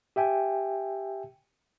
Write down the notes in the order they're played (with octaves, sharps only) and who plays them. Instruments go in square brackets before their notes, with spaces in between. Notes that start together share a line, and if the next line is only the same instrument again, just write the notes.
[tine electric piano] G4 E5 G5 G#5